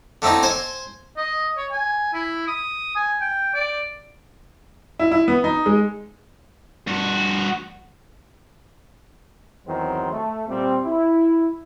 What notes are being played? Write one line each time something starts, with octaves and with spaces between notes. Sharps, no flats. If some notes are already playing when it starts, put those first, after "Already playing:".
D3 A3 C4 D#4 E4
C5 G#5 C6
D#5
C#5
G#5
E4
D#6
G#5
G5
D5
E4
E4
B3
D#4
G#3
G2 F#4
E2 D#3 F#3 C4 C5
A3
A#2 G3 C4
E4